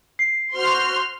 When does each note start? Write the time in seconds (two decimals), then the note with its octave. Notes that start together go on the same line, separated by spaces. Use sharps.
0.19 C7
0.53 F#4 C5 C6 F6